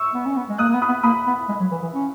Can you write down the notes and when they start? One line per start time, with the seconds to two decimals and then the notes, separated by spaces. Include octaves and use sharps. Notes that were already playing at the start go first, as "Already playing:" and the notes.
Already playing: C#6 E6
0.14 B3
0.26 C#4
0.36 B3
0.49 G#3
0.58 A#3 D#6 F#6
0.69 A#3
0.74 B3
0.82 B5 D#6
0.89 B3
1.03 A#3 B5 D#6
1.27 B3
1.49 G#3
1.60 F#3
1.71 E3
1.82 E3
1.93 C#4